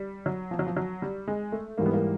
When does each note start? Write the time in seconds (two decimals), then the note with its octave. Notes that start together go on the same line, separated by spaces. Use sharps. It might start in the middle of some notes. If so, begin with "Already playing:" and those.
Already playing: G3
0.26 F#3
0.51 F3
0.59 F#3
0.67 F3
0.77 F#3
1.02 G3
1.28 G#3
1.52 A3
1.78 G#2 E3 G3 A#3
1.86 B3
1.93 A#3